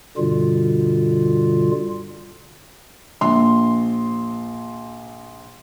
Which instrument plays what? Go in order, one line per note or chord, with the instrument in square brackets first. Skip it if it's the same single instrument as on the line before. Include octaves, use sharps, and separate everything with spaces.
[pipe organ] G2 B2 D3 G3 F4
[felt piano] A#1 C6